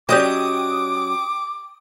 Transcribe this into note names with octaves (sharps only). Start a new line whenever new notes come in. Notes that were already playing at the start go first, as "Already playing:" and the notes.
F#3 C#4 G4 D5 D#5 G5 D6 D#6